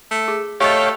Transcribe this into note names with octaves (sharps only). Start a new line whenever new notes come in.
A3
G#4
A3 G4 C#5 D#5 F5 G5